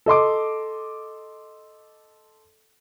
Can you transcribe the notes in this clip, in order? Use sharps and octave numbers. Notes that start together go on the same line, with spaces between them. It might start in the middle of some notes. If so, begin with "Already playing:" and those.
A4 D#5 C6 D6